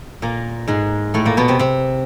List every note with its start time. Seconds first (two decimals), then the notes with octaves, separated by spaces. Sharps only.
0.22 A#2 A#3
0.68 G#2 G#3
1.14 A2 A3
1.25 A#2 A#3
1.37 B2 B3
1.48 C3 C4
1.59 C3 C4